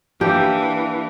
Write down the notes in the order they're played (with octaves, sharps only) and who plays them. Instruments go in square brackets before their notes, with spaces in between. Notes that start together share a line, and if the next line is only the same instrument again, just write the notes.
[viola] E3 [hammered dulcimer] A#3 D4 [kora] G4